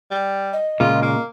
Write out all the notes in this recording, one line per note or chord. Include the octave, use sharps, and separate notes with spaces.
G3
D#5
A#2 C#3 G#3 F4
A#3